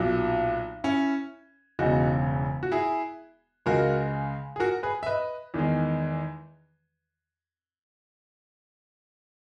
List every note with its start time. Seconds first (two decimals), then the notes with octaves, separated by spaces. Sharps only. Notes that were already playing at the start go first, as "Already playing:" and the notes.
Already playing: B1 A#2 F#3
0.84 C#4 E4
1.79 E1 E2 C#3 D#4 F#4
2.63 F#4
2.72 E4 G#4
3.66 C#2 C#3 G#3 F#4 A#4
4.56 G#4
4.60 F#4 A#4
4.83 G#4 B4
5.03 E5
5.06 B4 D#5
5.54 E2 D#3 G#3